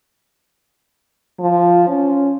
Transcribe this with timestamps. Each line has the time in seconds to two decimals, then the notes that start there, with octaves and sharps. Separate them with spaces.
1.39 F3
1.88 C#4